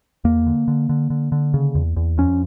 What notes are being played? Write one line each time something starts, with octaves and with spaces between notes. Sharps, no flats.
E2 A#3
D3
D3
D3
D3
D3
C#3
E2
E2
F2 C#4